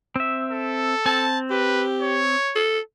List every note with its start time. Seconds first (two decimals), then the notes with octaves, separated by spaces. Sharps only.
0.16 C4 E5
0.51 A4
1.06 C4 A5
1.50 G4 B4
2.02 C#5
2.55 A4